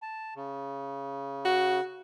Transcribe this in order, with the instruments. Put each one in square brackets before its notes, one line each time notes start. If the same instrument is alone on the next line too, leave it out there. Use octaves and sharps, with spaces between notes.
[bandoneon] A5
C#3
[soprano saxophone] F#4